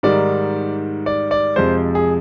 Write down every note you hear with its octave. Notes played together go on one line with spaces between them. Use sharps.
G#2 D#3 G3 D5
D5
D5
F2 C3 F3 G#3 C5
G#4